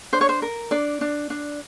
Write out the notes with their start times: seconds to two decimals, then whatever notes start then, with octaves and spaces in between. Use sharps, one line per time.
0.13 D4 C5
0.21 C#5
0.29 C5
0.42 A#4
0.71 D4 D5
1.01 D4
1.30 D4